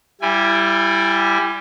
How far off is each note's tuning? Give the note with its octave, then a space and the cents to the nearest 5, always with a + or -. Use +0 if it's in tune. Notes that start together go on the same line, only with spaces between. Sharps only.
G3 +0 E4 +25 G#5 -20